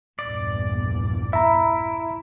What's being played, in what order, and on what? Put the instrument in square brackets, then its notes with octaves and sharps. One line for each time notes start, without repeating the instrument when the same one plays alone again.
[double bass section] A#1 E2 G2 [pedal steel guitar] D5
[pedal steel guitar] E4 [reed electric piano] E5 A#5